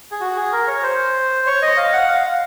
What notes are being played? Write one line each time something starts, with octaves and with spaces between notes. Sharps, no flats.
G#4
F#4
G#4
A#4
C#5
C5
C#5
D#5
F5
F#5
F5